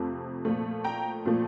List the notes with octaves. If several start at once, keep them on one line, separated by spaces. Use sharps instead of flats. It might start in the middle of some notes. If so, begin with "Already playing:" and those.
Already playing: F2 C3 F3 A3
A#2 F3 A3
G5 A#5
A#2 F3 A3